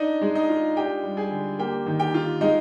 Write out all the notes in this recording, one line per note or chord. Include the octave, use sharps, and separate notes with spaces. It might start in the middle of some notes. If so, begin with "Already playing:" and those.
Already playing: D4 D#4 D#5
G#3
D#4 D#5
F4
D4 G4 G5
G3
G#4 G#5
D3
A#3 G4 G5
D#3
G4 G5
F4
G#3 D#4 D#5